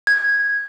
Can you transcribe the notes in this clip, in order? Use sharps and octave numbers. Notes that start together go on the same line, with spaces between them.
G#6